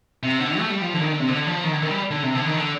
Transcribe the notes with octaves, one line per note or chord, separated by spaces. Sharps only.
C3
D3
A3
G3
F3
D3
D#3
D3
C3
D3
F3
D#3
D3
D#3
G3
D3
C3
D3
D#3
D3